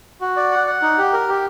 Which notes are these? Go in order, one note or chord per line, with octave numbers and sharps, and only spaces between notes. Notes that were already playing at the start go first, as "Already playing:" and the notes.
F#4
D5
F#5
F#5
D#4
G4
A#4
G4